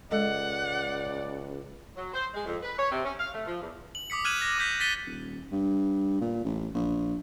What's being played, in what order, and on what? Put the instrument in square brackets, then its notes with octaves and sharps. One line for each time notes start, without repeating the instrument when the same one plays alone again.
[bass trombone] C#2 [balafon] G#3 A4 D#5 [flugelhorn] D5 [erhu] F#5
[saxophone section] F#3
C5
G#3
F2
B4
C#5
C3
C#4
F5
A3
F3
E2
[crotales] F#7
D6 D#6 B6 C#7
F6 F#6 G#6 D#7 E7 F#7
A#6
D6 D#6 G6 B6
A6 B6 C#7 D#7 G7
[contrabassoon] D#1
G2
A#2
A1
A#1